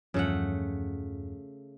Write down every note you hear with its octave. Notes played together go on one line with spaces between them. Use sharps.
E2 G2 C#3 F3 A3 F#5